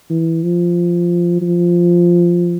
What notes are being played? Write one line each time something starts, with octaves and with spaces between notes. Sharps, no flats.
E3
F3
F3